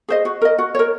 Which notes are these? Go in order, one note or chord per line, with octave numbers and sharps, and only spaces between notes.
G#4 C5 D#5
F#4
A#4 D#5
F#4
A#4 C#5